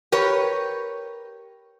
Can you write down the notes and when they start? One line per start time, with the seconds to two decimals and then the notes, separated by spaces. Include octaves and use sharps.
0.12 G4 A#4 B4 C#5